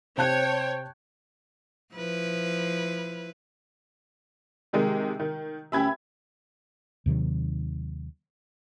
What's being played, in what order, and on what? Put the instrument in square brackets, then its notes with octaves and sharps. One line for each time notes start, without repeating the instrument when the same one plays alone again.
[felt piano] C3 A5 F#6 [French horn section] C5 [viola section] C#5 [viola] G5
[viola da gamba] F3 E4 B4
[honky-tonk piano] C3 D#3 G#3
D#3
[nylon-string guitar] D2 C#4 G4 [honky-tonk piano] E5 B5 G#6
[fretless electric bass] D#2 C3 D#3 F#3